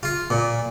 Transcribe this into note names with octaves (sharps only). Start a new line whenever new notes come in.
F4
A#2